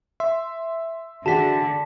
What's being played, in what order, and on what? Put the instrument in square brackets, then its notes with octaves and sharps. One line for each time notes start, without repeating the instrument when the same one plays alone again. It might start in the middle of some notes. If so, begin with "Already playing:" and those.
[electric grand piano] E5 [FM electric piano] C6
[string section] D3 [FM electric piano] F#4 G#4 F#5 [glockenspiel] A5 B6